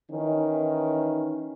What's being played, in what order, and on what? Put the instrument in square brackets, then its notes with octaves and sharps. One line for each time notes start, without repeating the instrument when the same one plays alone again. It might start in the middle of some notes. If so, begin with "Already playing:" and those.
[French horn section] D#3 E3 C#4 D#4